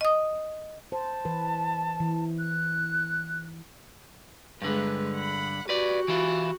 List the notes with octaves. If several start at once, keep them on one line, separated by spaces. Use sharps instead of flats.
D#5 D#6
C5 A5
E3 B4
E3
F#6
G2 D3 G#3 B4
F#5 B5
F#4 G4 B4 D5
E3 E4 F4